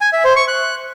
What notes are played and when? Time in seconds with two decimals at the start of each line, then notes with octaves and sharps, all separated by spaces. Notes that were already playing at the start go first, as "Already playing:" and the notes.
0.01 G#5
0.13 E5
0.24 C5
0.36 C#6
0.48 F#6